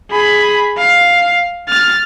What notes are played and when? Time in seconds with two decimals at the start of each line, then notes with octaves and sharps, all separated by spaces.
0.11 G#4 B5
0.78 F5
1.68 F6 A6